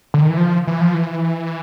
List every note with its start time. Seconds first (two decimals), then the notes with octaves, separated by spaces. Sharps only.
0.14 D3
0.22 D#3
0.29 E3
0.37 F3
0.67 E3
0.81 F3
0.94 E3